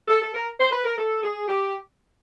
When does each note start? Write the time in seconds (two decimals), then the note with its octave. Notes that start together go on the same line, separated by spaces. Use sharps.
0.08 A4
0.22 A4
0.33 A#4
0.59 C5
0.71 B4
0.84 A#4
0.98 A4
1.23 G#4
1.48 G4